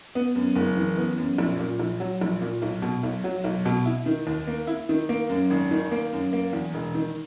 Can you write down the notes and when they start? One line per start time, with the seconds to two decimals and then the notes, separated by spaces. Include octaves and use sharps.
0.15 B3
0.35 F#2
0.56 F#1
0.77 E3
0.97 B3
1.18 F#2
1.38 A#1
1.59 A#2
1.80 A#1
2.00 F#3
2.21 A#1
2.41 A#2
2.62 B1
2.82 B2
3.03 B1
3.24 F#3
3.44 B1
3.65 B2
3.85 E4
4.06 D#3
4.27 D#2
4.47 A#3
4.67 E4
4.89 D#3
5.09 A#3
5.29 F#2
5.50 G#1
5.71 D#3
5.92 A#3
6.12 F#2
6.33 A#3
6.53 E2
6.74 E1
6.94 D#3